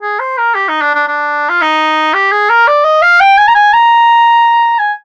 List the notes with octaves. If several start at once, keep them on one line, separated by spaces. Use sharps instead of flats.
G#4
C5
A#4
G4
D#4
D4
D4
D4
F4
D#4
G4
G#4
A#4
D5
D#5
F5
G5
G#5
A#5
G#5
A#5
G#5